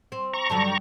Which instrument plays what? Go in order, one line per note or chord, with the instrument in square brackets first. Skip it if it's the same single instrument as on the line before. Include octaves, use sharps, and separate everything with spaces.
[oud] C4
[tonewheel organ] A#5 C#6
[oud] G2 D3 F#3 [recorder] A5
[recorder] G5